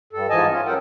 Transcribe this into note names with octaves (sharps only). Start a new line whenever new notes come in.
G2 A4
G#2 E3 F3 D#5 G#5 A5
C#4 F4
G2 F#3 A4 A#4 F#5 G5